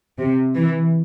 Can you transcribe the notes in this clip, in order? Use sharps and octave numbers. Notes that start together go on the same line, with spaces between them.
C3
E3